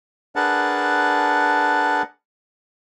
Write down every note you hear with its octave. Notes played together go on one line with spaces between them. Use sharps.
D4 G#4 A#4 B4 F#5 A5